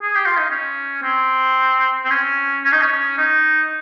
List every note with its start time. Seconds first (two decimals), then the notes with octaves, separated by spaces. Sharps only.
0.02 G#4
0.15 G4
0.26 F4
0.38 D#4
0.50 C#4
1.03 C4
2.04 C4
2.10 C#4
2.64 C#4
2.73 D#4
2.81 C#4
3.18 D#4